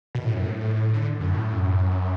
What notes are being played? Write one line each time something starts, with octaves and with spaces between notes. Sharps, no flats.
B2
A2
F#2
A2
D3
F#2
A2
F#2